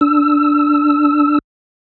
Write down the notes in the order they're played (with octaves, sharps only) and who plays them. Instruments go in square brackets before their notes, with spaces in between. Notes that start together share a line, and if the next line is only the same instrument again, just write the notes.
[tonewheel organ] D4 E6